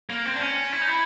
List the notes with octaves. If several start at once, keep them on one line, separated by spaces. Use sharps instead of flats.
A#3
C4
D4
C#4
E4
D#4
E4